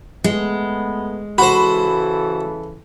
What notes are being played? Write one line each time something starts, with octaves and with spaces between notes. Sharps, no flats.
G#3 A3 B3
C#3 E3 F#4 A4 C5 B5